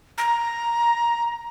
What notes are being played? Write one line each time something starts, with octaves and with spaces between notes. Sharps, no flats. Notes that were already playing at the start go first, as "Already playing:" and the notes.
A#5